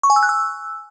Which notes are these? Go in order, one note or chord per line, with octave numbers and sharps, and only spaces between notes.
C#6
G#5
E6
F#6
E6